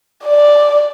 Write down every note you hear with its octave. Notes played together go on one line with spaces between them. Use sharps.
D5